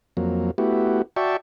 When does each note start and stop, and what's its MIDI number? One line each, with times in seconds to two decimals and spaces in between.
0.17 0.51 41
0.17 0.51 54
0.17 0.51 58
0.58 1.02 57
0.58 1.02 59
0.58 1.02 64
0.58 1.02 66
0.58 1.02 67
1.16 1.37 66
1.16 1.37 74
1.16 1.37 76
1.16 1.37 79
1.16 1.37 81
1.16 1.37 85